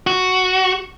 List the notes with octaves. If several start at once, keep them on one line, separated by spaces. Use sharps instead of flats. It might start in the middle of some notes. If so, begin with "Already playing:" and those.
F#4